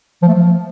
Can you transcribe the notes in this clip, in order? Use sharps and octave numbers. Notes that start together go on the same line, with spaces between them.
F3
A3
F3